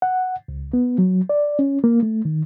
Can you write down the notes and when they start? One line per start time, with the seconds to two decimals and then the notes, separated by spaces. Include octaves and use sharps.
0.02 F#5
0.48 C#2
0.73 B3
0.98 F#3
1.29 D5
1.59 C#4
1.84 A#3
2.03 A3
2.25 D#3